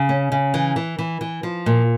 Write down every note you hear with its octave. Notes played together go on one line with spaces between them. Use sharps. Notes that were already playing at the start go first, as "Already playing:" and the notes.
Already playing: C#3
C#4
C#3
E3
E3
E3
E3
F3
A#2